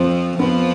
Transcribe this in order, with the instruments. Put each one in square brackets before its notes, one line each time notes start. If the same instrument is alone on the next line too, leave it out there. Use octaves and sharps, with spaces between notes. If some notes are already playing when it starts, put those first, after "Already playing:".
Already playing: [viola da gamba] F2 F3 [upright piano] C4
[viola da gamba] F2 F3 [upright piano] B3